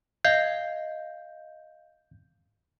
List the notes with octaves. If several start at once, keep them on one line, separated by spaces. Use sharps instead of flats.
D#5 F5 G6 C7